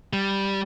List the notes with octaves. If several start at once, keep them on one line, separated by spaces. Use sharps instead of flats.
G3